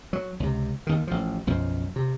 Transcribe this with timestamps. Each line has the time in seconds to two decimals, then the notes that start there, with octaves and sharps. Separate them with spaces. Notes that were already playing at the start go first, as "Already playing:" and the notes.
0.13 F#3
0.40 C#2 C3
0.87 D#2 D#3
1.07 A1 F3
1.47 B1 F#2 F3
1.96 C3